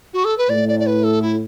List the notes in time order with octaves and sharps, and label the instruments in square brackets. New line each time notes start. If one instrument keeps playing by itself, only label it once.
[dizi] F#4
A4
B4
[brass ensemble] A2 [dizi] D5
[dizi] D5
D5
B4
A4
E4